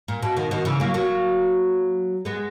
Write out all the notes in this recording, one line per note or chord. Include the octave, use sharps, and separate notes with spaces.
A#2
B2
B2 D#3
B2 D#3
C#3 E3
F#3 A#3
F#3 A#3
G#3 B3